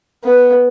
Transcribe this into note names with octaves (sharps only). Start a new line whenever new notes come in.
B3